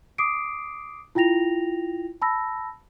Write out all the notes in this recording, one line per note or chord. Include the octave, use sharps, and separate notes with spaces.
D6 D#6 C7 D7
E4 F4 G5 A#6 F7
A5 B5 E6 A#6